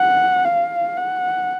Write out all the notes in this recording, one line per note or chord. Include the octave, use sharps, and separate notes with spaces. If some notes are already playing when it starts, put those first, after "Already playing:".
Already playing: F#5
F5
F#5